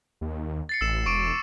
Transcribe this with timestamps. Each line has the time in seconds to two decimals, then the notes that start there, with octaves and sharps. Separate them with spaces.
0.21 D#2
0.69 A6 C7 C#7
0.81 A1 E6 E7
1.06 E1 C#6 D6 D7